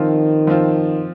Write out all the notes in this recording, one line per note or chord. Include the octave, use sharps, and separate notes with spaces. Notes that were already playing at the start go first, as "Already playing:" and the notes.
Already playing: D#3 F3 C4 F4
F3 C4 F4